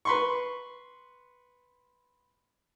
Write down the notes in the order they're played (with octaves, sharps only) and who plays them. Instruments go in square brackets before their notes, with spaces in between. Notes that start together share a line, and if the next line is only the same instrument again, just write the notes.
[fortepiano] B4 C6 C#6